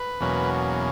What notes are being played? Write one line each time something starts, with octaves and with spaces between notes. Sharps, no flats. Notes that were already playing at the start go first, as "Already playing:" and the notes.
Already playing: B4
E2 B2 F#3 A#3 C#4